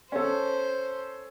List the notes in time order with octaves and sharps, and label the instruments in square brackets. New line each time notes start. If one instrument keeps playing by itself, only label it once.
[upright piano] C#4 A4 [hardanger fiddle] C5